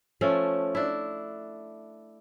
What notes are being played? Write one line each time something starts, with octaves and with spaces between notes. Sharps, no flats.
F3 A3 C#4
D4 E4